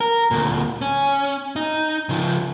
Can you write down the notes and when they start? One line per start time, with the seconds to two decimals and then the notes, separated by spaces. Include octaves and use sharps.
0.01 A#4
0.31 D2 A#2
0.81 C#4
1.56 D#4
2.09 C#3 F3